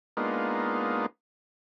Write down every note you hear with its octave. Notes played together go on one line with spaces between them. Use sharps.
G#3 A#3 B3 D4 D#4 F4